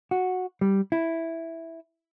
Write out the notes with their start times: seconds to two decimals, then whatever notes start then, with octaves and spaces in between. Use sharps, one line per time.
0.11 F#4
0.61 G3
0.92 E4